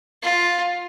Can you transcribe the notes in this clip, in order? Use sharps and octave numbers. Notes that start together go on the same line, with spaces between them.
F4